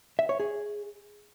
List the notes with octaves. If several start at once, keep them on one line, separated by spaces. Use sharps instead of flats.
E5
C#5
G#4